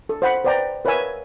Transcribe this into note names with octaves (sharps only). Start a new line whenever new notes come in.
A4
C5 F#5 B5
B4 C5 D5 G5 A#5
A#4 B4 C#5 E5 G#5 E6